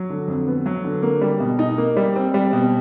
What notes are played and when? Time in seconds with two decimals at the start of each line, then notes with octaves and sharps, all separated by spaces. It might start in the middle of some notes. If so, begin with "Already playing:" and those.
Already playing: F#3
0.10 D3
0.28 F2
0.47 B3
0.66 F#3
0.84 D3
1.03 A#3
1.21 G3
1.40 B2
1.59 D#4
1.78 A#3
1.97 G3
2.16 C4
2.34 G3
2.53 B2